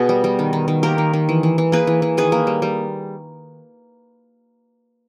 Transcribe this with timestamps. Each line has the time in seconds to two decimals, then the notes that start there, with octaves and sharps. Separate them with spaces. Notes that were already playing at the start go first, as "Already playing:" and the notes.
Already playing: B2 B3 G#4 B4
0.09 G3
0.24 G3
0.39 D#3
0.53 D#3
0.68 D#3
0.83 A#3 G4 A#4
0.98 D#3
1.13 D#3
1.29 E3
1.43 E3
1.58 E3
1.72 A#3 G#4 B4
1.87 E3
2.02 E3
2.17 D#3 G#4 B4
2.32 A#3
2.47 G3
2.62 G3